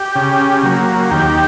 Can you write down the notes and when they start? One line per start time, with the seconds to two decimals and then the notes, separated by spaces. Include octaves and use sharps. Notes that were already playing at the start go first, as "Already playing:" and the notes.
Already playing: G4
0.16 C#3
0.63 F#3 A#3
1.11 D#2 G4